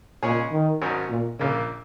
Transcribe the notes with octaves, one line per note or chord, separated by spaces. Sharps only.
A#2 C#3 G#3 C#4 G#4 C#5
D#3
G#1 G#2 D#3 F#3 C#4
A#2
A#1 A#2 C#3 A#3